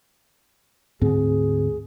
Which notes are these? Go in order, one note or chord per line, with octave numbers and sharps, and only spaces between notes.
D2 G#2 C4 G#4